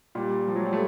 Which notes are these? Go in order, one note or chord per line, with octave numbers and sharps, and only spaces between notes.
A#2 G3
F3 G3
F#3
G3
A3